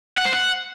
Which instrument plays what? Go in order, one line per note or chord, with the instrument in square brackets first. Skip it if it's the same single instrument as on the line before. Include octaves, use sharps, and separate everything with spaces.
[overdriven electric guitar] F#5
C5
F#5